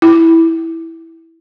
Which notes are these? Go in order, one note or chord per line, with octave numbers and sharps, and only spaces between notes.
E4